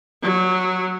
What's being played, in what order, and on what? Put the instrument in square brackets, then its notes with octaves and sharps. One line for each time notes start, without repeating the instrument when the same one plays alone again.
[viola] F#3